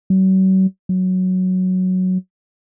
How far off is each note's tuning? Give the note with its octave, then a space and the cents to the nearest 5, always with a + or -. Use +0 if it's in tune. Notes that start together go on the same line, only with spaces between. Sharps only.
F#3 +40
F#3 +0